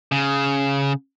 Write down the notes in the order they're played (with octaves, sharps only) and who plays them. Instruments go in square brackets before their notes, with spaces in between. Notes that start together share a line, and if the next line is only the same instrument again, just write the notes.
[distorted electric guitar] C#3